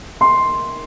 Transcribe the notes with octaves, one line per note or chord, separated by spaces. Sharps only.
C6